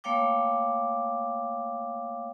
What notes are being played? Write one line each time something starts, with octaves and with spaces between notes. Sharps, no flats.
A3 A#3 C#5 F5 G5 D6